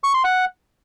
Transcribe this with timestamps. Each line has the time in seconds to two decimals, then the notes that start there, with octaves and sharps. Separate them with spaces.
0.04 C#6
0.14 C6
0.24 F#5